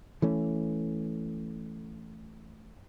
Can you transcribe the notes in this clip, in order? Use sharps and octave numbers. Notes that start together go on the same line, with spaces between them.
E3 A3 C#4